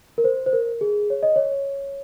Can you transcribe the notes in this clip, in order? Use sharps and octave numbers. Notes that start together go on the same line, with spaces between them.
A#4
C5
C5
A#4
G#4
C#5
D#5
C#5